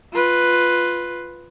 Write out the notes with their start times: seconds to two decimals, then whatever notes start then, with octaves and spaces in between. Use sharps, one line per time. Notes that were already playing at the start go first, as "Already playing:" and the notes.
0.13 F4 B4